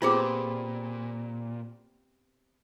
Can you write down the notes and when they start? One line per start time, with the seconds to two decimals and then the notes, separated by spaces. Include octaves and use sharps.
0.02 A#2 B3 C4 F4 G4 G#4 D6